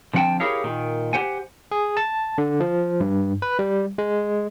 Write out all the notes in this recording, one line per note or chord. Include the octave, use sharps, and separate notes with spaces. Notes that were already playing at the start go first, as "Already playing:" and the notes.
D3 F3 C4 F#5 G5 A5
E4 G4 G#4 A#4 C#5 F5
A#2 D#3
G4 C5 F#5 G#5
G#4
A5
D3
F3
G2
B4
G3
G#3